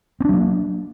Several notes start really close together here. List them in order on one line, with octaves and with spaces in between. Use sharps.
C4 D4 F#3 A#3